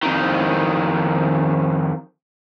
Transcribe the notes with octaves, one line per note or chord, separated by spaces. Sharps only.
F2 D#3